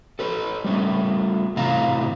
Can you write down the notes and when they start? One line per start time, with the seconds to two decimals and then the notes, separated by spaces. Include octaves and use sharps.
0.19 A4 B4 C#5
0.64 G3 A3 C#4
1.56 A2 C3 E3 F5 A#5